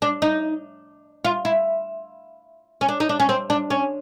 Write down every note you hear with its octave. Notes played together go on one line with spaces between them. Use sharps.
D4
D#4
F4
E4
C#4
D4
D#4
D4
C#4
C4
D4
C#4